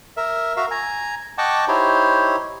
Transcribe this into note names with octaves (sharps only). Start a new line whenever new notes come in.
A#4 E5
F#4 A#4 E5 F5
G#5 A#5
D#5 F#5 G5 A5 C#6 D6
D#4 E4 G4 C5 C#5